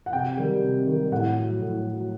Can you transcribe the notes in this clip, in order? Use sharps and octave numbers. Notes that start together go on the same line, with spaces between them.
F#5
C3 G5
D#3 G3
C3
D#3 G3
A2 F#5
F#3
A2
F#3